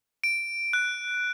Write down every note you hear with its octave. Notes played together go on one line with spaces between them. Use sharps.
D7
F#6